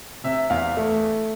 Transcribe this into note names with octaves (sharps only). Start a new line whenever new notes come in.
C3 E5
E2 F5
A3